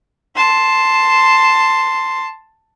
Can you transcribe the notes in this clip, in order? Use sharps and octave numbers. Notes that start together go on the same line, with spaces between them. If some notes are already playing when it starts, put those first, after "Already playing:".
A5 C6